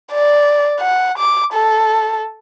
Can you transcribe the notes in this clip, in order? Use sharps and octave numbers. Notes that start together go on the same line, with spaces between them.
D5
F#5
D6
A4